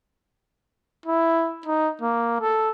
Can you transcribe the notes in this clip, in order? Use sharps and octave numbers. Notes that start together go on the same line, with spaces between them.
E4
D#4
A#3
A4